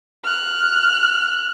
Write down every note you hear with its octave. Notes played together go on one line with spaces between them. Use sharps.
F6 F#6